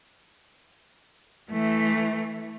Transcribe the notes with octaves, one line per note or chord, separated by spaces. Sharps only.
E3 A3